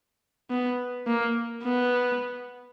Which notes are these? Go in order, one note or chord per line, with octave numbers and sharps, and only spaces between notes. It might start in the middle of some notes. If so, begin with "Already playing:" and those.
B3
A#3
B3